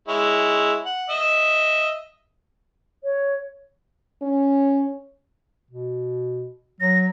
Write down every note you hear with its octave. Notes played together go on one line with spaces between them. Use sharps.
G#3 E4 C#5
F#5
D#5 E5
C#5
C#4
B2
F#3 A#6